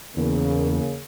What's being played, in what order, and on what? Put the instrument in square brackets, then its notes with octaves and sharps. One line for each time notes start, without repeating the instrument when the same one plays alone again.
[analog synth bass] E2 [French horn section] C#3 A#3